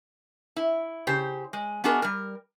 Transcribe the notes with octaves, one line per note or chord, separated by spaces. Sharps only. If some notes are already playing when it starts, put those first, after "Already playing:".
E4
C#3 G4 C5
G#3
B3 D4 F#4 G#4 A#4 D#5
G3 A#4